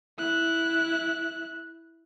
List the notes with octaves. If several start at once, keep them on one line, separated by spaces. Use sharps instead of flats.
E4 F#6